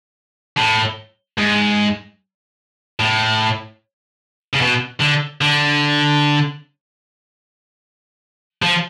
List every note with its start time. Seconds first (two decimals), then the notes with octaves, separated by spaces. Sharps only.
0.57 A2
1.38 G#2
3.00 A2
4.53 C#3
4.60 B2
5.00 D3
5.41 D3
8.62 F3